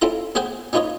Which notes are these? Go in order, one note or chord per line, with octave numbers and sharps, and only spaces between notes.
C4 C#4 E4 F4 A4 A#5
B3 C4 G#4 C5 F#5 G5
C#4 D#4 F4 B4 C#5 D#5